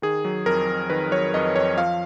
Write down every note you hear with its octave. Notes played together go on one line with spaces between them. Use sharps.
D#3 G#4
F#3
F2 A#4
F2
D#3 B4
F#3 C#5
F2 D#5
F2 C#5
F3 F5